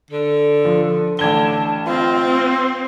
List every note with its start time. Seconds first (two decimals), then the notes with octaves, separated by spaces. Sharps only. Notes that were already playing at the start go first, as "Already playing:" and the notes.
0.11 D3 A4
0.65 F3
1.19 A1 D3 A5 G#6 G7
1.87 C4 F4 D#5
2.29 C6